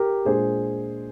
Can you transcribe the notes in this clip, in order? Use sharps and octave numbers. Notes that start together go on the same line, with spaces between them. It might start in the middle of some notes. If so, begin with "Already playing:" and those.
Already playing: G4 A#4
A#2 G#3 D4 G#4 C5